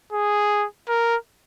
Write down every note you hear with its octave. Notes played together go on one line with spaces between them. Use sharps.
G#4
A#4